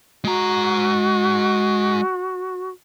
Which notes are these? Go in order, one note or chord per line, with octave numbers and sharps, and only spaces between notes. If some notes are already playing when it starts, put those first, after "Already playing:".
G#3 F#4 A#5